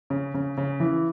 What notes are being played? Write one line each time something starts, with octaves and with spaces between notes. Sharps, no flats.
C#3
C#3
C#3
E3